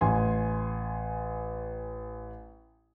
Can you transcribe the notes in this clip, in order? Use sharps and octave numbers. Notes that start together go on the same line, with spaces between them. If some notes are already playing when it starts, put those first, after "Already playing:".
A1 G#5 C6